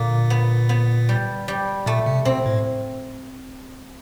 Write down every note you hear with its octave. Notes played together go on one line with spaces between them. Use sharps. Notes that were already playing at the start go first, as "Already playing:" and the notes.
Already playing: A#2 D3 A#3
B3
B3
G3
G3
A#2 A3
C3
B2 C4
A2